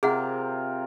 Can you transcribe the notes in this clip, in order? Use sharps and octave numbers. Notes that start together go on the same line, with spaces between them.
C3 F4 G#4 A#4 F#5